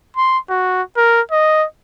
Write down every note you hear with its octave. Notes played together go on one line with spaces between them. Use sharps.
C6
F#4
A#4
D#5